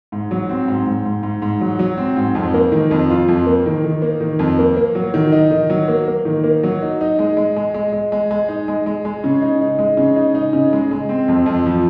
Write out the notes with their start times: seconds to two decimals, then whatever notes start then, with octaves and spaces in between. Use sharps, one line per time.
0.12 G#2
0.31 F#3
0.49 C4
0.68 G#2
0.86 G#2
1.05 G#2
1.23 G#2
1.42 G#2
1.61 F#3
1.79 F#3
1.98 C4
2.16 G#2
2.35 F2
2.54 A#3
2.72 D#3
2.91 F2
3.10 F4
3.28 F2
3.47 A#3
3.66 D#3
3.84 D#3
4.02 A#3
4.21 D#3
4.39 F2
4.59 A#3
4.77 A#3
4.95 F#3
5.14 D#3
5.32 D#4
5.51 D#3
5.70 F#3
5.88 A#3
6.08 A#3
6.25 D#3
6.44 A#3
6.63 F#3
6.82 D#4
7.01 D#4
7.19 G#3
7.37 G#3
7.56 G#3
7.74 G#3
7.93 G#3
8.12 G#3
8.31 G#3
8.48 D#4
8.68 G#3
8.86 G#3
9.05 G#3
9.24 C#3
9.42 D#4
9.61 D#4
9.79 G#3
9.97 C#3
10.16 D#4
10.35 D#4
10.53 C#3
10.73 G#3
10.91 G#3
11.09 C4
11.28 F2
11.46 F2
11.66 F3